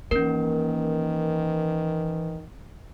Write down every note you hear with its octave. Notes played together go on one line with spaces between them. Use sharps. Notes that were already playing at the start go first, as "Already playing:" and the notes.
D#3 E3 A#3 C#4 A#4